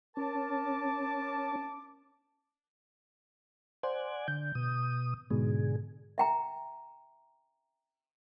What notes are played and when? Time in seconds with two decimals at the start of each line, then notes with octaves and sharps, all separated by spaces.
0.17 C#4 A#4 A5 D6
3.83 C5 D5 F#5 G#5
4.28 D3 G6
4.55 B2 D#6
5.30 G#2 B2 D3 G#4
6.18 E5 G5 A#5